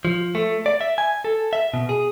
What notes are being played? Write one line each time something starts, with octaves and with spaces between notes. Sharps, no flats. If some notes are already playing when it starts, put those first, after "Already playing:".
F3
A3
D5
E5
G#5
A4
E5
B2
G#4